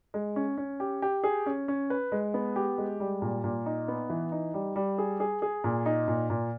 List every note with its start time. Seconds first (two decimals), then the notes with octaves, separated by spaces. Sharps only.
0.14 G#3
0.36 C#4
0.58 C#4
0.80 G4
1.02 G4
1.24 G#4
1.46 C#4
1.68 C#4
1.90 B4
2.12 G#3
2.34 B3
2.56 G4
2.78 G#3
3.00 G3
3.22 A#2
3.44 A#2
3.66 D#4
3.88 B3
4.10 E3
4.32 D#4
4.54 G3
4.76 G3
4.98 G#4
5.20 G#4
5.42 G#4
5.64 A#2
5.86 D#4
6.08 A#2
6.30 A#2